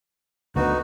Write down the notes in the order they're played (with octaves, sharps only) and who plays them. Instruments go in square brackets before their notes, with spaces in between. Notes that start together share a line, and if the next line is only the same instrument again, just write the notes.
[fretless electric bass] D2 A#3 B3 [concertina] D#4 F#4 [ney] B4